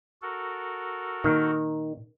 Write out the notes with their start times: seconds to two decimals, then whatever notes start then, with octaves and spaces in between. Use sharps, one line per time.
0.22 F#4 A4 A#4
1.24 A#2 D#3